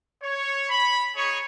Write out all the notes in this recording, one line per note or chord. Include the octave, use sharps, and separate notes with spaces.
C#5
B5
D#4 G#4 C#5 G#5 C#6